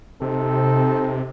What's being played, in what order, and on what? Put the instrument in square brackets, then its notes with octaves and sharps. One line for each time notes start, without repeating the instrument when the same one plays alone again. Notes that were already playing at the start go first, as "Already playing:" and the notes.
[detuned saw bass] C3 [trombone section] C4 D#4 A4